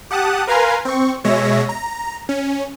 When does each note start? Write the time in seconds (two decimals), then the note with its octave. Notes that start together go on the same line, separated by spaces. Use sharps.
0.11 G4 F#5 A5 D#6 F#6
0.47 A#4 B4 F5 G#5 A#5 C6
0.85 C4 C#6
1.24 B2 G#3 C#5 E5 A#6
1.69 A#5
2.29 C#4